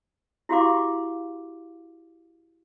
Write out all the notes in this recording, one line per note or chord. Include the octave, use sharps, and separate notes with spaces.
E4 F#4 G4 F5 C6 D6